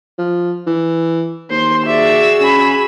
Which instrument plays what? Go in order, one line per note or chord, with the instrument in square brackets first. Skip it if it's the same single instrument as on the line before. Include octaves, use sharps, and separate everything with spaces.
[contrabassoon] F3
E3
[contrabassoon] D#2 [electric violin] C5 C6
[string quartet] F#4 G#4 E6 [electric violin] D5 E5
[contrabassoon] C#3 [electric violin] G#5 B5